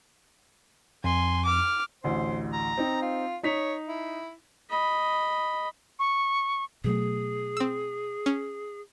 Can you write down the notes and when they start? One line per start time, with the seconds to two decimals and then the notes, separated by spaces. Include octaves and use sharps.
1.04 F2 G#5 C6
1.45 D6 F6
2.04 A1 D2 C5
2.53 A#5
2.77 C4 D#4 G5
3.02 F4
3.43 D#4 C#5 B6 F7
3.88 E4
4.70 D#5 B5
5.99 C#6
6.84 B2 F#3 A3 G#4
7.57 C4 E6
8.26 C#4